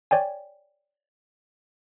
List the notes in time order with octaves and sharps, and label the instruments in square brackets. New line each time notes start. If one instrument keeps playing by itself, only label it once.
[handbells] C#5 D5 G5 G#5